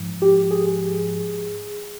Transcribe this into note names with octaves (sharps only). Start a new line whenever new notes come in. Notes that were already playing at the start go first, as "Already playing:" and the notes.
Already playing: G#2 F3
G4
G#4